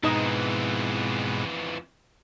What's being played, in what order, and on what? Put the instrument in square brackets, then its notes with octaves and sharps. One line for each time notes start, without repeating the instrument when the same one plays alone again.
[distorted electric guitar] F2 E3 [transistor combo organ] G#2 B2 [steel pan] D#4 D#5